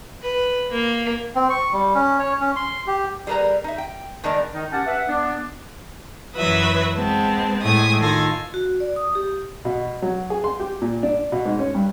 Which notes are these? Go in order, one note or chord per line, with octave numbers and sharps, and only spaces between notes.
B4
A#3
C4
C#6
G3
C#4
C#5
C#4
C6
G4
G3 G#4 A#4 B4 A#5
D#4 E5
G5
D#3 G#3 B3 D4 A#4 D5
D#3 D#4
C#4 G4 F#5 A5
B4 E5 F#5
B3 D4
F#2 E3 F#3 B4 E5 D#6
G#3 B3 C4 A5
A2 G#3 G#5 D#6
D#3 F4 A4 G#5 A#6
F#4
D5
D#6
G4
B2
F#3
G#4
C6
G4
A#2
D4
B2
G#2
C#4
G2